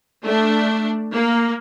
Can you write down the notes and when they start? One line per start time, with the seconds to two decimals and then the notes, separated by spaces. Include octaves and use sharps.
0.25 A3 D4
1.12 A#3